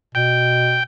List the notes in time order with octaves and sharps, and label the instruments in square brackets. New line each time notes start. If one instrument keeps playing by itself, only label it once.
[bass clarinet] B2 [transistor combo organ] G5